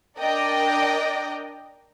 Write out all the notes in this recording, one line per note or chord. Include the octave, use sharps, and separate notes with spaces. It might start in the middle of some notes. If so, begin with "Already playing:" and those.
D4 A#4 D5 D#5 G5